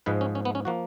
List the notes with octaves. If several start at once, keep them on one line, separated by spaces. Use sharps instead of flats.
G#2 F3 G#3 B4
C#4
C#4
B3
C#4
F3 A#3 F#4